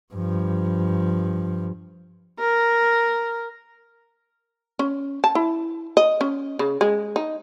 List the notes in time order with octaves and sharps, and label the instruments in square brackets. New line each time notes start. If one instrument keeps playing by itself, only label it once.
[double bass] G2 F3
[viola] A#4
[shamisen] C#4
A5
E4
D#5
C#4
C#3
G#3
D#4